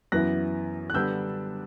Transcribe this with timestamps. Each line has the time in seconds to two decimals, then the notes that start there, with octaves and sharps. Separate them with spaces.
0.12 F#2 E3 B3 E4 F#6 A#6
0.90 F#6
0.94 D3 G3 B3 D4 E6 G6